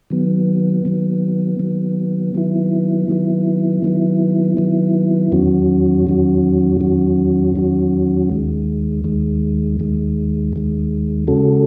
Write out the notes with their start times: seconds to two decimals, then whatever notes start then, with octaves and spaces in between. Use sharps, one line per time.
0.10 D#3 F#3 B3
0.85 D#3 F#3 B3
1.59 D#3 F#3 B3
2.35 D#3 F#3 B3 E4
3.08 D#3 F#3 B3 E4
3.82 D#3 F#3 B3 E4
4.57 D#3 F#3 B3 E4
5.32 E2 D#3 F#3 C#4 F#4
6.07 E2 D#3 F#3 C#4 F#4
6.80 E2 D#3 F#3 C#4 F#4
7.55 E2 D#3 F#3 C#4 F#4
8.30 D#2 D#3 G#3
9.04 D#2 D#3 G#3
9.79 D#2 D#3 G#3
10.53 D#2 D#3 G#3
11.27 C#3 G#3 C#4 F#4 A4